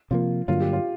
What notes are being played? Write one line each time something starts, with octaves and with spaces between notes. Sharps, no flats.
C3 F3 A#3 F4
G2 D3 F#3 A#3 F4
G4
F4